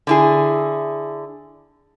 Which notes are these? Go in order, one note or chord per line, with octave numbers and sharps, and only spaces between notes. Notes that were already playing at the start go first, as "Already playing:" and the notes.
D3 E4 G#4